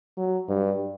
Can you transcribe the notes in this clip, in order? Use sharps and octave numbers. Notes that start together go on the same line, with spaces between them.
F#3
G2